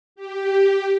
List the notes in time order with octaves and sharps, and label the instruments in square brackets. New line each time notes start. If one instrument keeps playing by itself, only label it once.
[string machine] G4